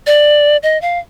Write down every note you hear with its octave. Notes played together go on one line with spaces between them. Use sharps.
D5
D#5
F5